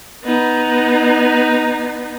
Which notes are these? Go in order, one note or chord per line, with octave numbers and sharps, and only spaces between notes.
B3 D#4